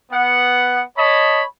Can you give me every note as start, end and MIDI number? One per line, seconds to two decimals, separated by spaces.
0.12 0.83 59
0.12 0.83 78
0.97 1.42 73
0.97 1.42 75
0.97 1.42 81
0.97 1.42 83